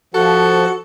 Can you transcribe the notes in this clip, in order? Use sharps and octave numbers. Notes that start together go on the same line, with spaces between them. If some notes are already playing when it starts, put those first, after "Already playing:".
F3 F#4 A4